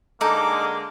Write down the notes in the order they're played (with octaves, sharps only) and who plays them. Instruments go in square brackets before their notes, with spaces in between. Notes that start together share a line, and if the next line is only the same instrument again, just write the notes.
[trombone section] D3 G#3 [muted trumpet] A#3 [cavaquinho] D#4 A4 [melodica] D6